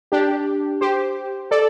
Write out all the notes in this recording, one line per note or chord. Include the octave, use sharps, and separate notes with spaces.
D4 G4
G4 C5
A4 D5